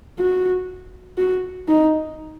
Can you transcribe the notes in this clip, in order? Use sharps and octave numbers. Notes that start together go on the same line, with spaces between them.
F#4
F#4
D#4